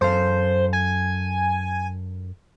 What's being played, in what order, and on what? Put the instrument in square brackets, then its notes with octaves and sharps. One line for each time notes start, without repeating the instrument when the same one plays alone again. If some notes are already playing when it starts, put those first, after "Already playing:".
[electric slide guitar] F#2 A4 F5 [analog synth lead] C5
[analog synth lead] G#5